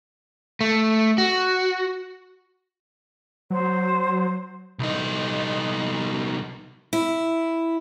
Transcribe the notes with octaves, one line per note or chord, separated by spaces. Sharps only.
A3
F#4
F#3 C5
C2 D#4
E4